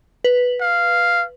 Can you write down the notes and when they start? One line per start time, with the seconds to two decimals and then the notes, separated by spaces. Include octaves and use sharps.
0.24 B4
0.61 F5